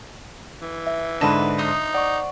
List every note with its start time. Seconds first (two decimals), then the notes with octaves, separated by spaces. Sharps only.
0.62 E3
0.87 E5
1.21 G#2 D3 D4 B4 D#5 A5
1.58 D#4 C5 D#6
1.94 D5 F#5 C#6